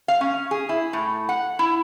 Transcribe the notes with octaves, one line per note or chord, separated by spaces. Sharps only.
F5
C#4
G#4
E4
A2
F#5
E4